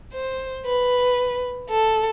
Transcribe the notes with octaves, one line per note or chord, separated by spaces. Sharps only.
C5
B4
A4